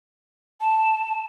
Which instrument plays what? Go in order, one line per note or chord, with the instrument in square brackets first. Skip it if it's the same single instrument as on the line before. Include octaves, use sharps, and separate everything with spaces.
[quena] A5